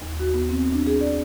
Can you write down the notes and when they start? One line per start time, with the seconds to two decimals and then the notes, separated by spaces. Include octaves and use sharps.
0.02 D#2
0.20 F#4
0.34 B3
0.49 C4
0.72 D4
0.86 G#4
1.01 D5